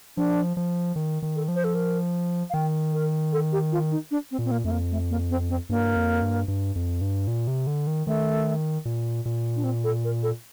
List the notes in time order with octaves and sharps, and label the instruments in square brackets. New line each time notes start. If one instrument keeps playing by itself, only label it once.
[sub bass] F3 [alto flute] D4
[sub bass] F3
D#3
D#3
[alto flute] A4
[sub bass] F3
[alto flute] C5
A4
A#4
F5
[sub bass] D#3 [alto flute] G5
[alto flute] A#4
A4
G4
F4
D#4
D4
C4
[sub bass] A#2
[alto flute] C4
A#3
[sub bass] F2 [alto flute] A3
[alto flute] A#3
A3
A#3
C4
C4
[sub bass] G2 [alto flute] A#3
[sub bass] F2
G2
G2
F2
G2
A#2
C3
D3
D#3
[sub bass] D#3 [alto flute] A3
[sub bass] A#2
A#2
[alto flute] D4
C4
A4
A#4
A4